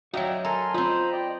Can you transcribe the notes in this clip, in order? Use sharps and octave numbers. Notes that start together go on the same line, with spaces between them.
F#3 D#4 F#4 D5 E5 F5 G5
A4 A#4 G#5 A#5 C6
C4 D#4 F4 C5 A#5 B5
D5 D#5 G5